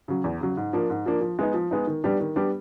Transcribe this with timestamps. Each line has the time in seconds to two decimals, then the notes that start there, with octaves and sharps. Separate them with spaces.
0.08 C#3 F#3
0.24 E2
0.41 C#3 F#3
0.57 G#2
0.73 F3 A#3 D4
0.90 G#2
1.06 F3 A#3 D4
1.21 F3
1.39 G#3 B3 D#4
1.54 F3
1.71 G#3 B3 D#4
1.87 D#3
2.04 G3 B3 D4 G4
2.20 D#3
2.36 G3 B3 D4 G4